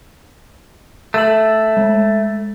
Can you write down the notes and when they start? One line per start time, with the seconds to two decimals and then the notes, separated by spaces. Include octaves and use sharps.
1.14 A3 E7 F#7
1.77 G#3